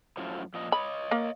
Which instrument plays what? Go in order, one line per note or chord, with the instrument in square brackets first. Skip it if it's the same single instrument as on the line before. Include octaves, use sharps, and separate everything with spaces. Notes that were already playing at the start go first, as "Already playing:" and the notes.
[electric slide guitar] F#2 A2 F3
A#2 F3 D#5
[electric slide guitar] C#5 D#5 [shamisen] B5
[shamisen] A#3